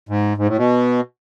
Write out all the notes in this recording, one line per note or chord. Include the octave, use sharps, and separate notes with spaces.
G#2
G#2
A2
B2